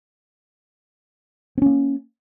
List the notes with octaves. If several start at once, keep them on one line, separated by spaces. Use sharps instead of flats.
A#3 C4 C#4